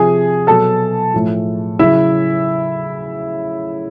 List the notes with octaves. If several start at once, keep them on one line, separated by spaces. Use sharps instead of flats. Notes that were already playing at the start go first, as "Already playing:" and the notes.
Already playing: C3 F3 G#4 G#5
B2 F#3 A4 A5
A2 F3
C#3 F#3 E4 E5